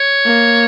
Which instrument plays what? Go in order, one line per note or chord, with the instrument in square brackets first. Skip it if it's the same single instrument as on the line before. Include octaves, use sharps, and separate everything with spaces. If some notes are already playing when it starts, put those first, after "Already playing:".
Already playing: [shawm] C#5
[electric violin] A#3